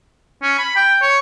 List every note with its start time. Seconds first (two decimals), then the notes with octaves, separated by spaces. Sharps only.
0.43 C#4
0.58 B5
0.76 G5
1.02 C#5